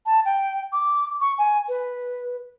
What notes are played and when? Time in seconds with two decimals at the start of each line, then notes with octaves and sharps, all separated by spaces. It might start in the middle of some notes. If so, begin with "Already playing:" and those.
0.06 A5
0.25 G5
0.73 D6
1.21 C#6
1.38 G#5
1.69 B4